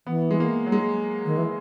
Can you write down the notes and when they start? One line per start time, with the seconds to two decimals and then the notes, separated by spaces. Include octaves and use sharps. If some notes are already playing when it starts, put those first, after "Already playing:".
0.07 E3 B3
0.31 G#3
0.40 A#3
0.66 F#3
0.72 G#3
1.26 D#3
1.37 E3